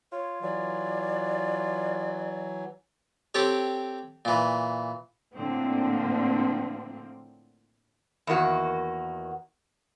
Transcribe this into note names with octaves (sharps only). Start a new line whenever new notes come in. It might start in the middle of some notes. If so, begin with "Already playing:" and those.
F4 C#5
E3 F#3 D5
C4 G4 A4 C#5
A#2 E3
A2 D3 F3 A#3 C4
E2 D#3 A#3 F#4